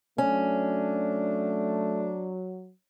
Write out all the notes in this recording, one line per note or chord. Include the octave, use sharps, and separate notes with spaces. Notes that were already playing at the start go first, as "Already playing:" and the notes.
F#3 A3 C#4 D4